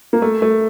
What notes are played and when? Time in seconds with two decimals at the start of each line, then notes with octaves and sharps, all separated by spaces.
0.13 A#3
0.22 A3
0.42 A3